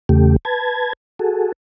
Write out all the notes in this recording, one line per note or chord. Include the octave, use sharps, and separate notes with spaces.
E2 C#3 A3 G4
B4 A5 G#6
F#4 G#4 A4